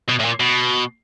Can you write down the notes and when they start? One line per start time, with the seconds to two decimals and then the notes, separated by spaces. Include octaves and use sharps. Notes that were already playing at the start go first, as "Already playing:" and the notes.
0.09 B2
0.20 A2
0.25 A#2
0.40 B2